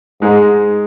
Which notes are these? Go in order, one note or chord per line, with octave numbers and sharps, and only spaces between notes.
G#2 G#3 D#4 G#4